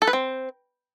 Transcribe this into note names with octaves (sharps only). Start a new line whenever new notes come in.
A4
B4
C4